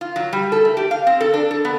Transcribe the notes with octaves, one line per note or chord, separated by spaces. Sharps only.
F4
F#3
G3
A4
A3
G4
F5
C4
A4
D4
A4
B3